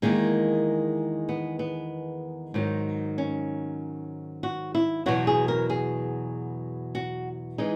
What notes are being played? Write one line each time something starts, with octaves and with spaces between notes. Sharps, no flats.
E2 D#3 G#3 A#3
B3
B3
G#2 D#3 F#3
C#4
F#4
E4
E2 B2 F#3 F#4
G#4
A#4
G#4
F#4
E3 G#3 D#4